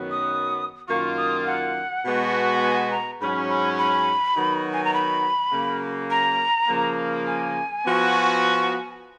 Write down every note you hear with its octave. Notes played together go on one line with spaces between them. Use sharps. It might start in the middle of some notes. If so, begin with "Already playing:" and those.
Already playing: F#2 D#3 F#3 B3
D#6
F#2 D#3 A#3 F4 C#6
D#6
F#5
B2 G#3 B3 F#4
F#5
G#5
A#5
G#2 F#3 C#4 B5
B5
B5
D#3 F#3 B3 D#4 F#4
G#5
A#5
B5
C#3 F#3 A#3
A#5
C#3 F3 A#3
G#5
F3 B3 F#4